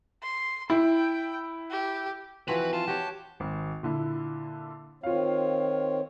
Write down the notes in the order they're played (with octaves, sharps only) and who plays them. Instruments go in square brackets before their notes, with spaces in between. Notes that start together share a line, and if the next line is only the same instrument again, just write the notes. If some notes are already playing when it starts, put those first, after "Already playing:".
[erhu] C6
[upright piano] E4 [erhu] G5
[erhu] G4
[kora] E3 F3 C4 [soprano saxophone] F#4 [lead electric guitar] B4
[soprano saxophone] F4 [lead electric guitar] A5
[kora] F#4 C#5 [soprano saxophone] G4
[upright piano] G#1
A#2 D3 E4
[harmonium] D#3 C4 C#5 [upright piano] F4 F5